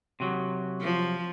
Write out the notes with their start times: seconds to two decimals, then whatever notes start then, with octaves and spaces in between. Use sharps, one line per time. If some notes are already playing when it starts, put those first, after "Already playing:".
0.20 C3 F#3
0.82 F3